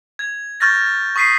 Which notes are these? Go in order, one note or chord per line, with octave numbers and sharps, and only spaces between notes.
G#6
C#6 F6 G6 A6 A#6
C#6 D#6 B6 C7 D#7